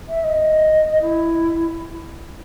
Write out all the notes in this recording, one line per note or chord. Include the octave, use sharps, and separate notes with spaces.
E5
D#5
E4